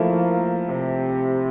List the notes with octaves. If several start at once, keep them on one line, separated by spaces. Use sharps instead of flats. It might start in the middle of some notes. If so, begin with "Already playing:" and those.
Already playing: F3 A3 A#3 E4
C3